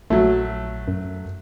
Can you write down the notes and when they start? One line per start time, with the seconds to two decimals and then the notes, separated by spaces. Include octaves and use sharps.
0.10 A#1 F#3 A3
0.88 F#2